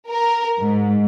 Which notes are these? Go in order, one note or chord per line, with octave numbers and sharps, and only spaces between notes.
A#4
G#2